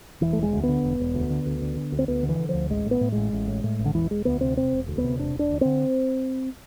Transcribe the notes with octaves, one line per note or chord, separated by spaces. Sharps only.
E1 E3
E1 A3
G#3
D2
B3
D3
E1
E1
D2
D3
D2
D3
D3
D2
C4
D2 B3
D3
E3
D3
F3
D2
A1 G#3
A2
B3
A2
A1 G#3
A1
A2
A2
A1
D3
E1 E3
E1 G#3
D2 B3
C3 C4
E1 C4
E1
D2
B3
C3
E1 D4
E1 D4
D2
D3 C4